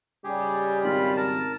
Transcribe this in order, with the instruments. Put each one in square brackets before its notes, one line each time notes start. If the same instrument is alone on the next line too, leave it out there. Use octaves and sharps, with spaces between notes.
[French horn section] G#2 C#3 G3 [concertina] G4 G#4
[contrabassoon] G#1 [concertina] F4 B5
[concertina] A#4 A5